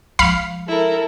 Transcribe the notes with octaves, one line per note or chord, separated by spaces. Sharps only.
F3 G#3 F5 B5
E4 A4 A#4